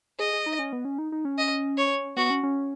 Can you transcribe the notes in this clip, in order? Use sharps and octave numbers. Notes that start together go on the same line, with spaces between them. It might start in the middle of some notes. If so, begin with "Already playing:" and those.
G#4 D#5
G#4
D#4
C#4
B3
C#4
D#4
D#4
C#4
D#5
C#5
B3 F#4
C#4
C#4